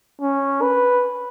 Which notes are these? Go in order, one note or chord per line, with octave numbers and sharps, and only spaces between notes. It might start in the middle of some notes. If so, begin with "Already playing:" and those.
C#4
B4